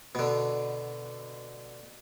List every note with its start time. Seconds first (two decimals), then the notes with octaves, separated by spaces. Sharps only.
0.15 B2 D3